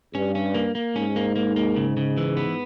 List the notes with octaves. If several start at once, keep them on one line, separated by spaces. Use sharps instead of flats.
G2 C#4
C#4
A#3
A#3
G#2 C#4
A#3
A#3
A#3
C#3
C#3
E3
B3